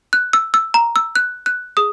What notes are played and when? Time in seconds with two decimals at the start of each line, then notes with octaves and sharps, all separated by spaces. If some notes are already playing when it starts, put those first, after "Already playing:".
0.13 F#6
0.33 E6
0.54 E6
0.74 A#5
0.96 E6
1.16 F#6
1.46 F#6
1.77 G#4 D#6